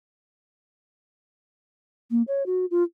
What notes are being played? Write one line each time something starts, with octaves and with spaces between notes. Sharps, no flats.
A#3
C#5
F#4
F4